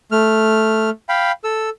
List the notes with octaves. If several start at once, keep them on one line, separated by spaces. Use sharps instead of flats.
A3 F6
F5 G5 B5
A4 E6